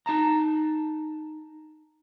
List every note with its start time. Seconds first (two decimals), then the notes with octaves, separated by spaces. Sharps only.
0.06 D#4 A5 A#5